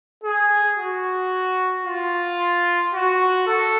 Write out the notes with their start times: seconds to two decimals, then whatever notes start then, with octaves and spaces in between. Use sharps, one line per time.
0.23 G#4
0.78 F#4
1.85 F4
2.93 F#4
3.47 A4